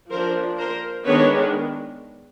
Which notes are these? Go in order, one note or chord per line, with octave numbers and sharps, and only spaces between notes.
F3 A#3 D4 A#4 C5
A#4 C5
D#3 G#3 B3 D4 B4 C#5